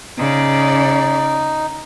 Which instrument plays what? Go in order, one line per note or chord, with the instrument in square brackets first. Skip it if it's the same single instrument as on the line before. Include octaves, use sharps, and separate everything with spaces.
[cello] C#3 D5 [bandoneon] D#4